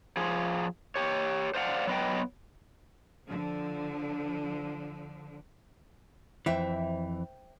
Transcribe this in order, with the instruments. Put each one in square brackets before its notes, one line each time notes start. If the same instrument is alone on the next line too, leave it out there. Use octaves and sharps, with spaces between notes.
[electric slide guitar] F3 G#4
G4 C#5
C5 D5 F5 F#5
F#3 B3 B4 D#5 G5
[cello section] D3 F3
[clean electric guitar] F2 E3 [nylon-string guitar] C5 E5 G5